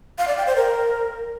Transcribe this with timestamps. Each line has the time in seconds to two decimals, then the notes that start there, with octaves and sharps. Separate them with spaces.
0.18 F5
0.28 D5
0.37 G5
0.47 C5
0.56 A#4